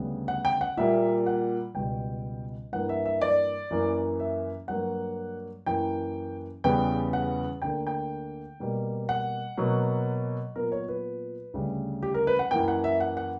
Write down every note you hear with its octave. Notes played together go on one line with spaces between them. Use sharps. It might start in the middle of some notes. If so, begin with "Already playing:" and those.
Already playing: D2 C#3 G3 B3
F#5
G5
F#5
A#2 G3 A#3 E5
F#5
C#2 B2 G3 G5
G2 E3 A#3 F#5
E5
E5
D5
F#2 E3 A#3
E5
G2 F#3 A#3 F#5
F#2 E3 A#3 G5
E2 C#3 G3 B3 G5
F#5
D2 D3 A#3 G5
G5
B2 G3 A#3
F#5
B2 F#3 A#3
A#2 F#3 B3 A#4
C#5
B4
D2 C#3 G3
G4
A#4
B4
F#5
F#2 E3 A#3 G5
F#5
E5
F#5
F#5